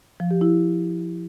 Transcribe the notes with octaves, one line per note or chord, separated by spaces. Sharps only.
F3
G4
E4